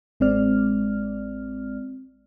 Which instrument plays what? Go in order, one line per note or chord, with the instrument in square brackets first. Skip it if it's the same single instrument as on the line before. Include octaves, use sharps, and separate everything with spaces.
[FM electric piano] A1 G#3 C4 D5 F6